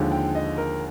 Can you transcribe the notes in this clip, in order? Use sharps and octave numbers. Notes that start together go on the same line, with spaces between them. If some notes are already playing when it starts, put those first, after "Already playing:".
Already playing: D#2 D3 F3 G#3
G5
D#5
A#4